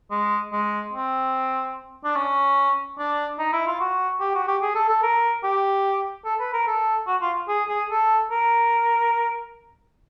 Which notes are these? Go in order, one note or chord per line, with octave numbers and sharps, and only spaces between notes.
G#3
G#3
C4
D4
C#4
D4
D#4
E4
F4
F#4
G4
F#4
G4
G#4
A4
A4
A#4
G4
A4
B4
A#4
A4
F#4
F4
G#4
G#4
A4
A#4